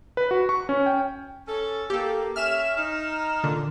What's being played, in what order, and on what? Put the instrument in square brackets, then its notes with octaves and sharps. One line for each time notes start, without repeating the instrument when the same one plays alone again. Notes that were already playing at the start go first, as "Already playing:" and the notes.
[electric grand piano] B4
F#4
C#6
C#4
G5
[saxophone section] C#4 A4
[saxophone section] A#3 [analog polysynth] G4 A4
[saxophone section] C#4 E5 [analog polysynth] F6 E7
[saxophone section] D#4
[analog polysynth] A#2 D3